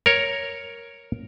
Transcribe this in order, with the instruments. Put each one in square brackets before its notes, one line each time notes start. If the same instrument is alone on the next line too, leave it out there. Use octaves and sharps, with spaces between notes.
[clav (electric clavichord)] A#4 C#5